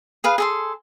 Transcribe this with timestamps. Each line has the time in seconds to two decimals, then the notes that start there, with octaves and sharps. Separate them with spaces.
0.24 G#4 B4 F5
0.38 G#4 A4 C6